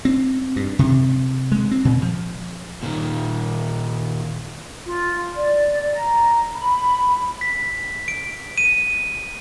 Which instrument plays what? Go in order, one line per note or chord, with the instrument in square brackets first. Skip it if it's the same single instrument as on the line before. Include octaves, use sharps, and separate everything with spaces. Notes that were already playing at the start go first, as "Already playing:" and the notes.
[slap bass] C4
G2
C3
G#3
C4
A#2
F3
[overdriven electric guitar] A#2 D#3
[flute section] F4
D5
A#5
B5
[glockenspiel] B6
D7
D#7